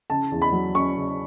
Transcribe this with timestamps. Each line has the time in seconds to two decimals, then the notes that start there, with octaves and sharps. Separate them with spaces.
0.10 C#3 A5
0.31 E2
0.42 B5
0.52 F#3
0.75 C#4 C#6
0.96 C#3